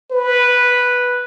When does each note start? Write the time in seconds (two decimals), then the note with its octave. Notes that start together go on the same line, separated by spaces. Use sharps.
0.12 B4